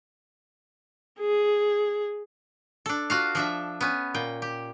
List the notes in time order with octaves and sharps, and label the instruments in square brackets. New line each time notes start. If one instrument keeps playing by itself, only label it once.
[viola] G#4
[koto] D4 A4
F4 F#4 F5
F3 D4 E5
B3 C#4
A#2 G5
G4